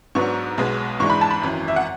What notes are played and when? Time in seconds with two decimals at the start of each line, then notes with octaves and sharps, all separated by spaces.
0.15 G#2 F#3 B3 D4 C#6
0.58 B1 B2 G#3 B3
1.00 G#2 E3 G#3 D4 C#6
1.10 B5
1.21 A5
1.31 B5
1.42 G#1 F#2 E3
1.68 E5
1.76 F#5